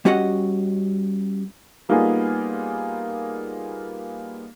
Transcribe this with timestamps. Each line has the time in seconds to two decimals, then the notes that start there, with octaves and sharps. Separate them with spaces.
0.05 G3 C#4 F#4 G4 D#5 F#5
1.89 G3 A#3 B3 D#4 F4 G#4